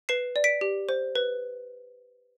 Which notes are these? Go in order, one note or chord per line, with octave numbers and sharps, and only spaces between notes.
B4 C7 E7
D5
B6 D7
G4
C5
B4